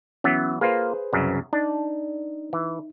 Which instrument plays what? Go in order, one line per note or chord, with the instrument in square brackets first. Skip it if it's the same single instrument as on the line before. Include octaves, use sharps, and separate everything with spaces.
[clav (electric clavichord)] E3 F#3 B3 [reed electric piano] C#4
[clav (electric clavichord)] A#3 F4 [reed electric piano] G#4 B4 C5
[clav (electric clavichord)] C2 F#2 C#3
[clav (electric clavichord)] D4 [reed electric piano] D#4
[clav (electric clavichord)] E3